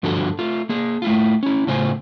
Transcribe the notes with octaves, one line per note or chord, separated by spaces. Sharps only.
G2 D3 F3 F#4 A4
A3 F4
A#3 G#4
A3 E4 F4
C#4 E4
A2 C#3 F4 C5 G#5